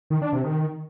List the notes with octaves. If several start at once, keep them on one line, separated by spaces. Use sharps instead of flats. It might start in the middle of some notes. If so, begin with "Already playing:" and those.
D#3
D4
C3
D#3